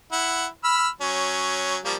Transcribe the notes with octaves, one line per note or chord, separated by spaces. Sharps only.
E4 F#5
B5 E6 F6
F#3 C#4
F3 G3 A#3